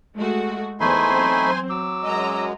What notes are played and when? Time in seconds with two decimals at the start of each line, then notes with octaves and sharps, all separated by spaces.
0.16 G#3 A3 F#4
0.80 E2 A3 D#4 C5 G#5 B5 C6
1.12 F#3 C4
1.70 F#3 D6 E6
2.04 F#2 G#3 D#5 A#5